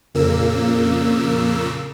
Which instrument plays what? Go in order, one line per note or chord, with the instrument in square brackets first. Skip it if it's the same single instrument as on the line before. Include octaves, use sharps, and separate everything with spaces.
[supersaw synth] F2 A#2 C#3 A#3 E6